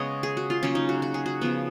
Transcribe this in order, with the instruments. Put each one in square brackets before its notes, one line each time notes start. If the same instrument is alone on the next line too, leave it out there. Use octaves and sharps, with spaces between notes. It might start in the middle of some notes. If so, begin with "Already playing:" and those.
Already playing: [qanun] C#3 G#3 B3 C#5 D#5
G#4
F#4
F4
C#3 F#3 A#3 C#4
D#4
F#4
F#4
G#4
F#4
C#3 F3 B3